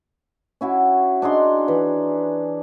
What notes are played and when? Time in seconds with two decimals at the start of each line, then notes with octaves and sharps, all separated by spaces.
0.61 C#4 E4 F#4
1.22 D4 D#4 G#4 C6
1.68 E3